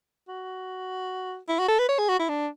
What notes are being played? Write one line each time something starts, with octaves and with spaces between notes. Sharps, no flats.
F#4
E4
F#4
A4
B4
C#5
G#4
F#4
E4
D4